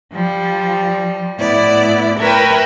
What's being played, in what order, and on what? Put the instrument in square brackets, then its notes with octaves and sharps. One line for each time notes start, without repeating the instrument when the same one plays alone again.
[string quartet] F3 G3
A2 A3 B3 E4 D5
A#4 B4 C#5 E5 G5